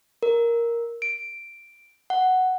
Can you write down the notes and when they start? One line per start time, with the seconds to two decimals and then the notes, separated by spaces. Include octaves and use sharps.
0.23 A#4
1.02 D7
2.10 F#5